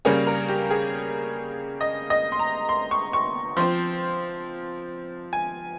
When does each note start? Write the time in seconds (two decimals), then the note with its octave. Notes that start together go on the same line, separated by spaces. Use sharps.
0.05 C#3 G3 A#3 C#4 G#4
0.27 A#4
0.49 G4
0.71 G#4
1.81 D#5
2.10 D#5
2.32 C6
2.39 A#5
2.69 C6
2.91 C#6
3.13 C#6
3.57 F3 C4 C6
5.33 G#5